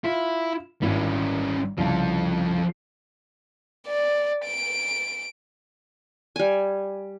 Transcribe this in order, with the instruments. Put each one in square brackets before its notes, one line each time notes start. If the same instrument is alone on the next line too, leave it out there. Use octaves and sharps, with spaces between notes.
[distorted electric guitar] E4 [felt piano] F4
[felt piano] G#1 E4 [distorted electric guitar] G3 C#4
[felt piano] C2 C#3 [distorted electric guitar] F3 A4
[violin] D5
D7
[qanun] G3 G#5